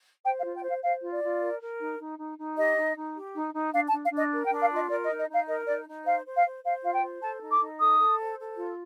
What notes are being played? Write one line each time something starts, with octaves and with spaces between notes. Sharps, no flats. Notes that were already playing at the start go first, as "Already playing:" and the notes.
C5 G5
F5
F4
G5
C5
F5
C5 F5
F4
D5
F4
A#4
A#4
D#4
D#4
D#4
D#4
G4 D#5
D#4
D#4
G4
D#4
D#4
D4 F5
A5
D4
F5
D4 D#5
A#4
G5
D4
F5
F4 D#5
A#4 D5
D#5
D#4
D#5
D#4 F5
A#4 D#5
D#4 D5
D#4
C5 F5
C5
F5
C5
C5 F5
F4 F5
G5
C5
A4 A5
D#4
D6
D#4
A4 D#6
A4
C5
A4
F4